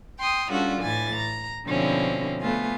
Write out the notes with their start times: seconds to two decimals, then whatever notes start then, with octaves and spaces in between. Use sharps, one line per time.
0.19 G5 C6 D#6
0.49 G3 C#4 D4 F4 F#4 A4
0.80 A2 E3 G#5 A6
1.15 A#5
1.67 B2 D3 F3 C4 C#4 E4
2.41 A3 B3 F4 G#5